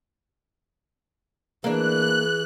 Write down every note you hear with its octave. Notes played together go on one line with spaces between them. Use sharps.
E3 A#3 D4 G#4 F#6